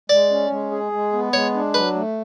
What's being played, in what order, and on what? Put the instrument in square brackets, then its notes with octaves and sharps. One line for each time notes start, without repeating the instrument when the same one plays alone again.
[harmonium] G#3 [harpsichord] D5
[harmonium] C#4
G#3
G#4
G#3
B3
[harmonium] G#3 [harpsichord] C#5
[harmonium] D4
[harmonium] F#3 [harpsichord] B4
[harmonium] A3